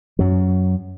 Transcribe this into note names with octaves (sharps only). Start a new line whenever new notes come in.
F#2 F#3